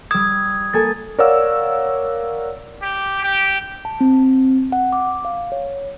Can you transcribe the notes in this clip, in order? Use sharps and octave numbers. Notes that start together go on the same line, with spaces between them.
G3 D#6 E6 G#6
A#3 A4 G#5 A6
A#4 C#5 D5 F5 F#5 E6
G4
G4
A5
C4
F#5
D6
F5
C#5